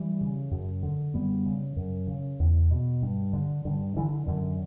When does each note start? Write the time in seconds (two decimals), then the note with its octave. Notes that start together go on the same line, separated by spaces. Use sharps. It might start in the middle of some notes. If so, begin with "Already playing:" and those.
Already playing: E3 G3
0.21 C#3
0.51 F#2
0.83 D3
1.14 F#2 G3 B3
1.46 C#3
1.76 F#2
2.07 C#3
2.40 E2
2.71 B2
3.02 G2
3.33 D3
3.65 G2 D3
3.96 D3 E3
4.26 F#2 D3